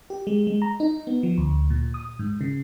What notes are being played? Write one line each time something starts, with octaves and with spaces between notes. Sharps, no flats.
G4
G#3
G#3
A#5
D#4
B3
F3
D2
A#2
D#6
G#2
C#3